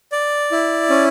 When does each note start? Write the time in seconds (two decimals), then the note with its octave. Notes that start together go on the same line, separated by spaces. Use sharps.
0.12 D5
0.51 E4
0.90 C#4